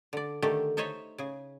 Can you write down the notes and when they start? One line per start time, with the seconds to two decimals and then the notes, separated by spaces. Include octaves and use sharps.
0.13 D3 D5
0.42 D3 D#3 A3 G4 A4
0.77 D#4 A4 C5 C#5 D#5 E5
1.18 C#3 G#4